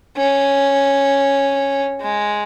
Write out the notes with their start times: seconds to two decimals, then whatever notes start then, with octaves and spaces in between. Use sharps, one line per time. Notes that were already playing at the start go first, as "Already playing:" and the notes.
0.17 C#4
2.01 G#3